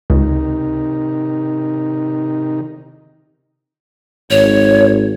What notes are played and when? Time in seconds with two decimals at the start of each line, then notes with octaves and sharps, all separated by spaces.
0.10 C#2 C3 D#3 D#4
4.31 G#1 C#5